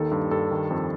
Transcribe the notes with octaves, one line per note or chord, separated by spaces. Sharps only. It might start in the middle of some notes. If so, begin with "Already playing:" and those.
Already playing: D#2 D#3 A4
G2
G2 A4
D#3
F2